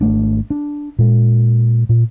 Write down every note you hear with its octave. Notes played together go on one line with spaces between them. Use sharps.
G#1 A3 D4
D4
A#2 G#3
A#2